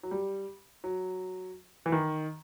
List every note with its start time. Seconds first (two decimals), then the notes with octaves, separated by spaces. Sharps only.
0.03 F#3
0.11 G3
0.84 F#3
1.86 E3
1.92 D#3